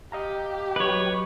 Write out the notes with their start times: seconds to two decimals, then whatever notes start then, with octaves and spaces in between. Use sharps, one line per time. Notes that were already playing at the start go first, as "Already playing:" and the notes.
0.12 G4 D#5 F5 A#5
0.76 F#3 B4 C#5 D#5